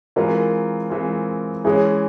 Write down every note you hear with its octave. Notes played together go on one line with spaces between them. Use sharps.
E3 G#3 C4 F4 A#4
E3 G#3 C4 F4
E3 G#3 C#4 G#4